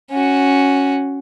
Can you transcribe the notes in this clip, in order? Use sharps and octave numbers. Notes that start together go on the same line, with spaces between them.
C#4 F#4